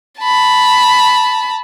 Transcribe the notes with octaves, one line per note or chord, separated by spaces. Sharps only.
A5 B5